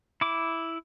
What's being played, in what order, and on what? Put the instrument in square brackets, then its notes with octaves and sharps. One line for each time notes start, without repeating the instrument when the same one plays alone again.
[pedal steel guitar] E4 D6